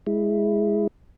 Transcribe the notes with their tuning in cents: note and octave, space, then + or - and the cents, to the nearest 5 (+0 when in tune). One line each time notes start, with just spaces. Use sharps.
G#3 +0 E4 +0